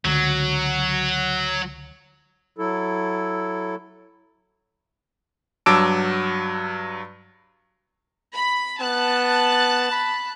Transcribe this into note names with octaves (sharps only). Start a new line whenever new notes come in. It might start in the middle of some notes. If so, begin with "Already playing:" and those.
C#2 D3 F#3
F#3 E4 A4
G2 F#3 A5 D6 E6 D7
B5
B3 A5 F#6
B5